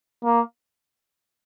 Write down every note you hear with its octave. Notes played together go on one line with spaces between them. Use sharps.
A#3